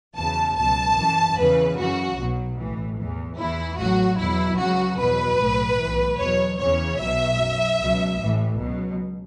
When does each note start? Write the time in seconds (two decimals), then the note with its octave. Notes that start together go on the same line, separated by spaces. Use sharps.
0.17 E2 C#3 F#3 A5
0.57 C#2 B2 F#3 A5
0.97 F#2 E3
1.37 E2 C#3 E3 B4
1.77 F#2 C#3 E3 F#4
2.17 B1 B2 F#3
2.57 A1 A2 E3
2.98 E2 E3
3.38 E2 E3 E4
3.78 A1 A2 F#3 F#4
4.18 E2 B2 F#3 E4
4.58 C#2 C#3 F#3 F#4
4.98 E2 B2 F#3 B4
5.39 B1 A2 F#3
5.78 B1 A2 E3
6.19 E2 B2 F#3 C#5
6.59 E2 C#3 E3 C#5
6.99 B1 B2 F#3 E5
7.39 F#2 F#3
7.79 C#2 B2 F#3
8.20 A1 A2 E3
8.60 C#2 B2 F#3